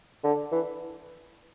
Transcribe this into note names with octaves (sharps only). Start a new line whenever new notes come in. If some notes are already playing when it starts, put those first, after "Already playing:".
D3
E3